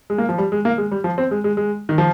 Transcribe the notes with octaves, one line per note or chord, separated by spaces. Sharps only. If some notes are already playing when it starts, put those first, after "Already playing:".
G#3
A#3
F3
G3
G#3
A#3
G#3
G3
F3
C4
G#3
G#3
G#3
D#3
F3